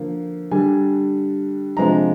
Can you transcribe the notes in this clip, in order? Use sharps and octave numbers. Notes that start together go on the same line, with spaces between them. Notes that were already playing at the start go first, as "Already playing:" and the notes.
Already playing: D3 F3 A#3
D3 G3 D4 G#5
C3 F3 G#3 D4 A#5